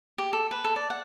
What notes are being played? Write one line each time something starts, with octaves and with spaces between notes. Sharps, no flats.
G4
A4
B4
A4
D5
F#5